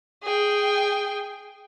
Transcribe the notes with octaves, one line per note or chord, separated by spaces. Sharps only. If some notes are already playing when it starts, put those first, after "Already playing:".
G#4 G5